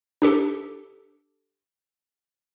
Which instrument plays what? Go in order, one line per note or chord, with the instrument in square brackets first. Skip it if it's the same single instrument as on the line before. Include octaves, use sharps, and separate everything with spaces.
[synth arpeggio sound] D4 G4 A4